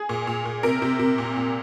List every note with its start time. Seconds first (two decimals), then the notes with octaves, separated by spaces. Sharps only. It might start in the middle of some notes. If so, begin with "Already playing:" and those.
Already playing: G#4
0.09 A#2
0.27 A#2
0.45 A#2
0.63 C3 A#4
0.82 C3
0.99 C3
1.18 A#2
1.36 A#2